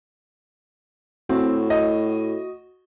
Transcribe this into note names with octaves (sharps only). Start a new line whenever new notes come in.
A2 C4 F#4
D#5